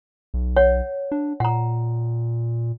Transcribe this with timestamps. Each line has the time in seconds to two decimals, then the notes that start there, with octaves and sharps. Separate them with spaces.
0.34 B1
0.57 C#5 F#5
1.12 D4
1.40 A#2 F#5 A#5